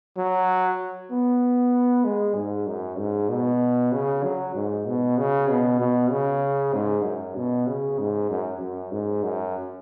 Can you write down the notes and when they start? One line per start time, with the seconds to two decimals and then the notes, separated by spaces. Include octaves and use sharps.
0.17 F#3
1.11 B3
2.04 G#3
2.35 G#2
2.67 F#2
2.99 G#2
3.29 B2
3.92 C#3
4.24 F#3
4.55 G#2
4.86 B2
5.18 C#3
5.49 B2
5.80 B2
6.11 C#3
6.74 G#2
7.05 F#2
7.36 B2
7.67 C#3
7.99 G#2
8.30 F#2
8.61 F#2
8.92 G#2
9.23 F#2